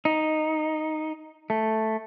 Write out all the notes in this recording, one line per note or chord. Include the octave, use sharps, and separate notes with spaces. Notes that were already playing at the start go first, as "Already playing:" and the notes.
D#4
A3